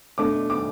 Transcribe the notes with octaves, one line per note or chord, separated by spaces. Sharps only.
B2 A3 D4 D6
D6